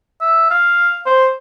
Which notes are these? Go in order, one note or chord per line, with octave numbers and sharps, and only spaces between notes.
E5
F5
C5